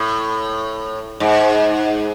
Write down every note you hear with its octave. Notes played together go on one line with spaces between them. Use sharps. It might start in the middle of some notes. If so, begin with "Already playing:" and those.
Already playing: A2
G#2